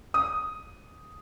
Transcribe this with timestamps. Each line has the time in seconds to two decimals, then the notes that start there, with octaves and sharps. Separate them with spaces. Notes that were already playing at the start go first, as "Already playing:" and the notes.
0.14 D#6